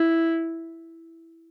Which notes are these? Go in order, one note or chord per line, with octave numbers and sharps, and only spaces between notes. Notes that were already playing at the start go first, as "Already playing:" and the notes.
Already playing: E4